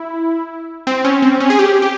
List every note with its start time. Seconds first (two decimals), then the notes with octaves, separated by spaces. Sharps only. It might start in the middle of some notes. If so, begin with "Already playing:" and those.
Already playing: E4
0.87 C4
1.05 C#4
1.22 C4
1.40 C#4
1.50 G#4
1.59 G4
1.82 G4